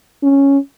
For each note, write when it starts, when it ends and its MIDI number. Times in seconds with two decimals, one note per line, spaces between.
0.23 0.58 61